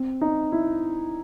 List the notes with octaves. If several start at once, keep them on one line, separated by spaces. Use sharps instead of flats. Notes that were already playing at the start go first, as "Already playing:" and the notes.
Already playing: C4
D#4
E4